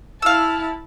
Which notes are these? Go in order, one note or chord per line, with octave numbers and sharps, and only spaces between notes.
E4 F5 A5 E6